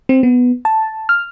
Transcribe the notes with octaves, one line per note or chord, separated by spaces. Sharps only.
C4
B3
A5
F6